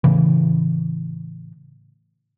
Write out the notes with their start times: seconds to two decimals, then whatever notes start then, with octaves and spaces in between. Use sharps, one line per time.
0.04 A2 C#3 E3